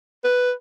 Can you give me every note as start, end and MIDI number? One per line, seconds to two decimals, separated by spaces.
0.25 0.52 71